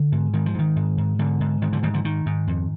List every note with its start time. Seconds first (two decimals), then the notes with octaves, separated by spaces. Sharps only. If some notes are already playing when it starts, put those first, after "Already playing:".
Already playing: D3
0.12 G#2
0.33 G#2 D#3
0.46 F3
0.55 G#2 D#3
0.76 G#2
0.98 G#2
1.19 G#2 D3
1.40 G#2
1.62 G#2 D#3
1.73 D3 F3
1.83 G#2 D#3 G3
1.94 D3 F3
2.04 G#2 D#3
2.26 G#2
2.47 F2